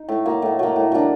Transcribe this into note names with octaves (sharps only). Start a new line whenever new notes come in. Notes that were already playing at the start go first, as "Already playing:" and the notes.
Already playing: D#4
A2
F#3 A#3
A2
F#3 A#3
A2
F#3 A#3 D4